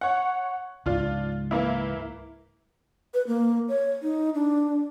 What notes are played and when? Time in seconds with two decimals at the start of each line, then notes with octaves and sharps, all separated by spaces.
0.01 C#5 F#5
0.86 C#2 G#2 D4 F4
1.51 E3 A#3 E4
3.14 B4
3.27 A#3
3.68 C#5
4.03 D#4
4.35 D4